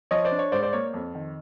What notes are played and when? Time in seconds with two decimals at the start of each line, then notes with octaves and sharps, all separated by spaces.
0.11 F3 C#5 D#5
0.25 C5 D5
0.32 D4
0.39 C#5
0.52 G#2 C5 D5
0.63 C5 D5
0.73 A#3 C#5
0.94 F2
1.15 D#3